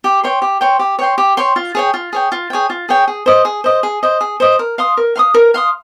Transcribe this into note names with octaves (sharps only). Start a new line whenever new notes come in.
G4
C#5 G5 C6
G4
C#5 G5 C6
G4
C#5 G5 C6
G4
C#5 G5 C6
F4
G#4 C#5 G5
F4
G#4 C#5 G5
F4
G#4 C#5 G5
F4
G#4 C#5 G5
G#4
C5 D#5
G#4
C5 D#5
G#4
C5 D#5
G#4
C5 D#5
A#4
F5 C6 D#6
A#4
F5 C6 D#6
A#4
F5 C6 D#6